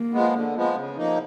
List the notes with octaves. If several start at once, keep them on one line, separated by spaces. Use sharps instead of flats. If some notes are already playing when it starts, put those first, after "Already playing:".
Already playing: A#3
F3 G#3 B3
D3
F3 G#3 B3
C#3
F3 A#3 D#4